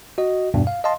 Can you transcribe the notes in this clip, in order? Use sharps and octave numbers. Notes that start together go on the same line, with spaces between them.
F#4 D#5
E2 G2 B2
F5
D#5 F5 A5 C6